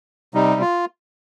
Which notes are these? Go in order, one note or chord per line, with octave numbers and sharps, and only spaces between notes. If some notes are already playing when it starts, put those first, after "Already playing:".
C3 G3 D#4
F4